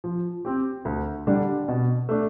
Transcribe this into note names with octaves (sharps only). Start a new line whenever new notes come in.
F3
C4 G4
D2
D3 G3 D4
B2
A3 D4